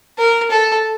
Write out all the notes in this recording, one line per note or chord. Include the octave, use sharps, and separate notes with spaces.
A#4
A4